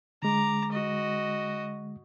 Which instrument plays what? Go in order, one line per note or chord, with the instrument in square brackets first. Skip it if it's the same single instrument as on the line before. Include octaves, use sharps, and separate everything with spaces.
[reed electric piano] D3 G#3 [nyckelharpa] A#5 D6
[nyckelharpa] F#4 D#5